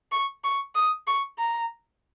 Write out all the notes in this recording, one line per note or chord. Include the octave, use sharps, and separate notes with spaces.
C#6
C#6
D#6
C#6
A#5